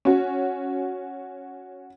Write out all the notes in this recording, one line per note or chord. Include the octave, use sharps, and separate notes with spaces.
C#4 F#4